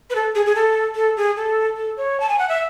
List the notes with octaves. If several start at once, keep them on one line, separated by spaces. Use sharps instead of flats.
B4
A4
G#4
G#4
A4
A4
G#4
A4
A4
C#5
A5
G#5
F#5
E5